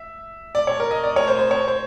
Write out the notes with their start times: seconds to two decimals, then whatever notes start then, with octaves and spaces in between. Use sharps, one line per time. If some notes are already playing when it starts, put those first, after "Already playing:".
Already playing: E5
0.55 D5
0.67 C#5
0.80 A#4
0.91 D#5
1.03 D5
1.16 C#5
1.28 C5
1.39 C5
1.51 C#5
1.68 C5